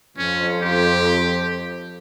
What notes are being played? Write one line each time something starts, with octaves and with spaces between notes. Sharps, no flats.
F2 C#4
G4